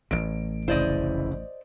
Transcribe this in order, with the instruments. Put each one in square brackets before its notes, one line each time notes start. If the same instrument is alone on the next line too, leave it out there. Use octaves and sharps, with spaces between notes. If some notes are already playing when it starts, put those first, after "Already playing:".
[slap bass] A1 A2 [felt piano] D7
[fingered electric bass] F1 C#3 [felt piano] E4 [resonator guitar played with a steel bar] C5 D5 D#5